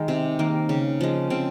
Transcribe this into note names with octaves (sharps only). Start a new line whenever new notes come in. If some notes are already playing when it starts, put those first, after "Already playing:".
Already playing: D#3 G#3 D#4
C3 C4
D#3 A#3
C#3
F3 G#3
C#3 C4